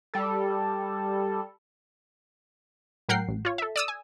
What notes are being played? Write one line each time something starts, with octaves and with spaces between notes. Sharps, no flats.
G3 A4
A2 F#3 A#4 F#5 G5 C7
A1
F4 C#5
A4 E5
D5 D#6 E6
G#5